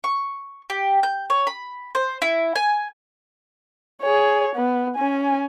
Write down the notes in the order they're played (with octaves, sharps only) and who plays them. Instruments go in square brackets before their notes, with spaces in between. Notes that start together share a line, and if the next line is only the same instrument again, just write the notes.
[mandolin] C#6
G4
G6
C#5
B5
C5
E4
G#5
[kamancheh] G#4 C#5
B3
C#4 G#5